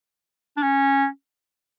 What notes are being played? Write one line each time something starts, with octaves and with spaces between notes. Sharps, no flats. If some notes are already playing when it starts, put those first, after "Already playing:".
D4
C#4